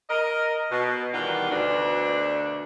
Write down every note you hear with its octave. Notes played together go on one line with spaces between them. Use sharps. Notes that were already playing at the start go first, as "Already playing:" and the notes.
A#4 D#5
B2
D#3 E3 G3 B3 D4 F4
D2 B2 D4